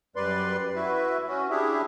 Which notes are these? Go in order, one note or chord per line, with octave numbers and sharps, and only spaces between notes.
F#2 G3 B4 D5 C6
E4 F#4 B4 E5
C#4 F#4
D4 E4 G4 G#4 E5